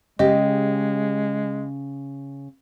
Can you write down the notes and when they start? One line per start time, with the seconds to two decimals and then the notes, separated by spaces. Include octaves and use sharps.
0.19 C#3 G#3 G4 D#5